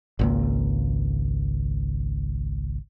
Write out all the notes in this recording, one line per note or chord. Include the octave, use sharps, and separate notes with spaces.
G#1 C#2 A#3